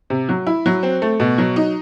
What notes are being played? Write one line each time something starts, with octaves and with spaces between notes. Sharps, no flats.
C3
F#3
E4
F#3
C4
A3
B2
F#3
D#4